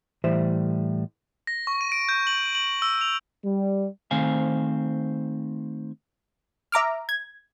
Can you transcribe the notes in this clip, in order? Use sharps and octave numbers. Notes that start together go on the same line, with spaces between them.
A2 E3 G3 C5 E5
A#6
C#6
D#7
D7
G6
F#7
F#7
E6
F7
G3
D#3 A3 C4 C5 F5 G#5
E5 A#5 D6 F6
G#6